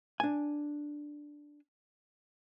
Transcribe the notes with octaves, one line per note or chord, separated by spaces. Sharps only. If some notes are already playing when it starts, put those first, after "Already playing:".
D4 G#5